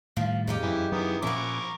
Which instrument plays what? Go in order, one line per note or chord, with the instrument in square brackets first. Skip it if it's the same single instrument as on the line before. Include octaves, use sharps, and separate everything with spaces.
[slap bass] A2 D#3 G3 [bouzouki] F3
[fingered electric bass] F2 [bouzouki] C#3 D#4 G4
[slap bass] F#2 [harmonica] E3
[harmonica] D#3 E3 B3 [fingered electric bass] F#3
[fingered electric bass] A#2 C#4 [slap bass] F3 [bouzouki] B3 E4 [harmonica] A#4 C#6 D6